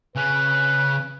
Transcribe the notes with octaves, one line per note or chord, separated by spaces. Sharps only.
C#3 C#4 B4